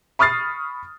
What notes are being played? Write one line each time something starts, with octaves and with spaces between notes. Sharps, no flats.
B5 C#6 D#6 F6 A6 C7